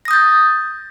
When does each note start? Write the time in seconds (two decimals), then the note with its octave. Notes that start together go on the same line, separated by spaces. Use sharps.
0.05 A#6
0.08 D#6
0.11 G6
0.13 A6